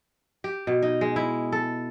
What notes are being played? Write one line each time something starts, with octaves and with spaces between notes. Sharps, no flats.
G4
B2
D#4
G#3
E4
A4